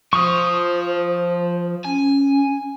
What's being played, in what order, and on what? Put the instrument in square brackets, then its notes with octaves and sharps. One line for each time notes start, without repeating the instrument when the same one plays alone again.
[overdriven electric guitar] F3 F4 [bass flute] C5 [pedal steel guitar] C#6 D#6
[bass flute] C#4 [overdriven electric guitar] G#5